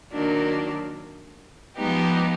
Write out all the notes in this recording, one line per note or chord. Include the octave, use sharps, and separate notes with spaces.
D#3 F#3 A#3 D4
F3 G#3 B3 D#4 G4